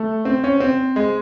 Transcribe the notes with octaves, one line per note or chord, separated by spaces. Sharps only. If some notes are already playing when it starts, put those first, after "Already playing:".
Already playing: A3
C4
C#4
C4
G#3